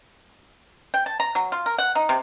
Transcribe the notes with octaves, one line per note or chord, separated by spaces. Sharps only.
G5
A5
A#5
F#3
F4
A#4
F#5
D#4
C3